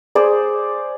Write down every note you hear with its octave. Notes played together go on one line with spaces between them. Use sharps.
G#4 C5 D5